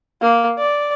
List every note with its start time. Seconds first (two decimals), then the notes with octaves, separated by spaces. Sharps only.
0.21 A#3
0.58 D5